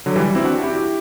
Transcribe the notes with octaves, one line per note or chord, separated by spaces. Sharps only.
D3 F#3
E3 G3
C4 E4
D4 F#4
E4 G4